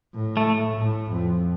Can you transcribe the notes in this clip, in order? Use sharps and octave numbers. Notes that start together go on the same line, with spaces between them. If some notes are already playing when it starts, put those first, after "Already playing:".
A2
A3
A2
F2